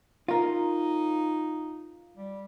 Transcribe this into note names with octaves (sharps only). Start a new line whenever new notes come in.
D#4 F4 A#4
G3